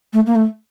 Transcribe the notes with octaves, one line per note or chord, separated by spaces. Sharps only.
A3
A#3
A3